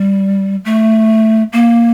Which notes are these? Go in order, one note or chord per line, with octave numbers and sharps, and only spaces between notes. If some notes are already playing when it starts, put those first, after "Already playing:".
Already playing: G3
A3
A#3